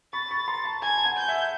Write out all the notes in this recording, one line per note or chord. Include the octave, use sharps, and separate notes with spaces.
B5 C#6 A6
B5 C#6
A#5 C6
A5 B5
G#5 A#5 G#6
A5
F#5 G#5
G6
E5 F#5